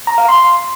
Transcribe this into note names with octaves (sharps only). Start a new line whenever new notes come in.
A#5
F5
C6